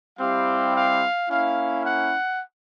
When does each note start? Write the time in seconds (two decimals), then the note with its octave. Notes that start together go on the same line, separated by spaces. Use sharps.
0.19 G3 C4 E4 G4 F5
0.75 F5
1.29 A#3 C#4 E4 F5
1.85 F#5